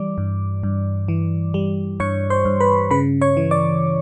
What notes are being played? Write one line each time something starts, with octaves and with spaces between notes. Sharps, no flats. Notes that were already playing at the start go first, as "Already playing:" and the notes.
Already playing: E3 G3 D5 D6
G2
G2
E3
G3
G2 C#5 C#6
C5 C6
G2
B4 B5
C#3 B4 B5
C#5 C#6
E3
D5 D6